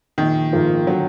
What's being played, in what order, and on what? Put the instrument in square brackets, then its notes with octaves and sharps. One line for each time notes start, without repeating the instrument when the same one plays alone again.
[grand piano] A#1 [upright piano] D#3
[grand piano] G#2 F3 A#3 F4
[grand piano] D3 [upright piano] F#3